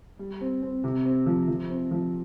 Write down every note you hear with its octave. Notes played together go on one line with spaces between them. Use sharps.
G3
C4
C4
C3
C4
F3
F3
C4
F3